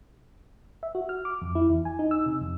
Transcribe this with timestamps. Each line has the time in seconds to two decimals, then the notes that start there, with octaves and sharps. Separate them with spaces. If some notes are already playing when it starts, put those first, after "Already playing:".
0.83 E5
0.95 F#4
1.09 F6
1.25 D6
1.42 F2
1.55 E4
1.70 E2
1.85 G#5
1.99 D#4
2.11 E6
2.26 C3
2.41 F2